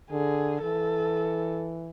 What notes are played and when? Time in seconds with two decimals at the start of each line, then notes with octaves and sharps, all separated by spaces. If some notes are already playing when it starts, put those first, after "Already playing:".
0.11 D3 G#4
0.62 E3 A4